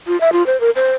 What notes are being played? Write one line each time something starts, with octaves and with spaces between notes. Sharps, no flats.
F4
E5
F4
C5
A#4
C5